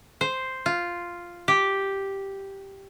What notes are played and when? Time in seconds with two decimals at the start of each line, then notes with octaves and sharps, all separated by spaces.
0.21 C5
0.66 F4
1.48 G4